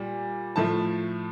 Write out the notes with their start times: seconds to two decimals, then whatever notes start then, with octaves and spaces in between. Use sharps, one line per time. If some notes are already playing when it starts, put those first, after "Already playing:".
Already playing: A#2 G3
0.56 A2 F3 A3 A5